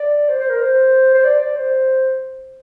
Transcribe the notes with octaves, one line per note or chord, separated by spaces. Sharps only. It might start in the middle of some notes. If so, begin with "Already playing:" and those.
Already playing: D5
C5
C5
A#4
C5
C5
D5
D5
C5